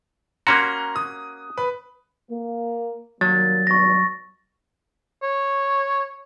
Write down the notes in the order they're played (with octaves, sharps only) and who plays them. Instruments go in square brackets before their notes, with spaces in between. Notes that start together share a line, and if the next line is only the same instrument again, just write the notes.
[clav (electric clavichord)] A#3 C#4 F#4 [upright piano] A#5 C6 F#6
[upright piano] D#6
B4
[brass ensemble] A#3
[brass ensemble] D#3 G3 A#3 [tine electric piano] F#3 [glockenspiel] A6
[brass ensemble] G#1 G2 B2 [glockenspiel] C#6 A#6
[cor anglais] C#5